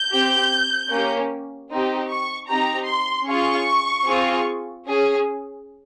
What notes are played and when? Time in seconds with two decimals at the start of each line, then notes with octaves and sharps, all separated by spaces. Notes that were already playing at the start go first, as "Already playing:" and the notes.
Already playing: G6
0.11 C4 G4
0.90 A#3 C#4 G4
1.70 C4 D#4 G4
2.09 C#6
2.48 C4 D#4 G4 A#5
2.88 C6
3.28 C#4 F4 G#4 C#6
4.07 C4 F4 G#4
4.86 C#4 G#4